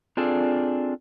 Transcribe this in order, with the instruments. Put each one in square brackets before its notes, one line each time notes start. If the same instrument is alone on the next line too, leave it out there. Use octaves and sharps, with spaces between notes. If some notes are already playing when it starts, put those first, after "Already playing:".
[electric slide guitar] C4 D4 F4 G#4 A4 D5